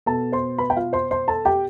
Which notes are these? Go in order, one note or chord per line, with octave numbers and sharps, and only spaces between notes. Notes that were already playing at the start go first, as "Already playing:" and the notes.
B2 A4 A5
C5 C6
B4 B5
G5
F4 F5
C5 C6
C5 C6
A4 A5
G4 G5